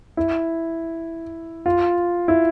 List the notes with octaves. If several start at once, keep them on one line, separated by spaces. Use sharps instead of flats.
E4
F4
E4